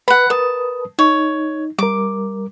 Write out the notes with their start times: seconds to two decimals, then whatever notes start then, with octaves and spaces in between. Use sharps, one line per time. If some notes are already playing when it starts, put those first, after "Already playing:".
0.08 B4 F#5 B5
0.30 A#4 B4 A5 D#6
0.99 D#4 C#5
1.79 G3 A#4 D6